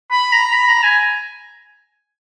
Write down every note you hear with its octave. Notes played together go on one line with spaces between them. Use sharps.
B5
A#5
B5
A#5
G#5